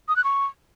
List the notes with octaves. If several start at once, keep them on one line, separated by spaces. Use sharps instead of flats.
D#6
F#6
C#6